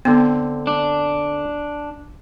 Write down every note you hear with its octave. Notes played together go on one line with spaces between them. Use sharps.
D3 B3 C4
D4